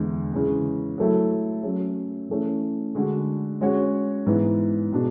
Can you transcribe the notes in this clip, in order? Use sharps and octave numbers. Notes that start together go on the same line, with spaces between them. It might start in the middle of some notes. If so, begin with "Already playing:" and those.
Already playing: E2 D3 G#3
C#3 E3 G#3
F#3 A3 E4 A4
F#3 A3 C#4
E3 A3 C#4
D3 G#3 D4 F#4
G#3 C#4 F#4 C#5
G#2 E3 B3
B2 G#3 D4